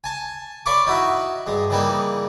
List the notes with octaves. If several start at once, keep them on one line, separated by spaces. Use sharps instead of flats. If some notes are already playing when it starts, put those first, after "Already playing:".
G#5 A5
C#5 D5 F5 B5 C#6 D6
D#4 E4 F#4 E5
G2 G#3
C#3 E3 G3 A#3 D#4